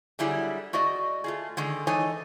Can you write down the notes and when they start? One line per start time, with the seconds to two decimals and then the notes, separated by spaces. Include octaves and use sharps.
0.19 D3 F#3 G3 E4 G#4
0.73 A3 F#4 D5 D#5
1.24 A3 F4 G#4
1.57 D3 D#3 G#3
1.87 E3 D#4 A4 C#5 D#5 G#5